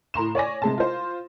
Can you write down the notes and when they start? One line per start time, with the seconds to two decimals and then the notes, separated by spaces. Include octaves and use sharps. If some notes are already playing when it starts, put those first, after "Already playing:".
0.14 A2 A#5 C6 E7
0.35 C#5 D5 G#5 A#6
0.62 C3 G#3 A5
0.78 F4 C5